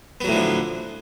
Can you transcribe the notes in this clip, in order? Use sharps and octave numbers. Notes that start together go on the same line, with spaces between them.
A2 D3 F3 F#3 B3